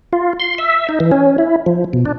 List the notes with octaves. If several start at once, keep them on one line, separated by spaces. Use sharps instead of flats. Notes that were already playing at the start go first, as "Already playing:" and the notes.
F4
C6
E5
D#4
E3
C#4
E4
F3
B2
D4